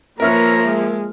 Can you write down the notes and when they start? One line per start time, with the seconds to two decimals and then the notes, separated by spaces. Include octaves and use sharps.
0.20 F3 A#3 A#4 B4 C#5 E5 A#5 F6
0.63 G#3